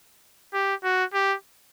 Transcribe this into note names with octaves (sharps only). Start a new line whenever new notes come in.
G4
F#4
G4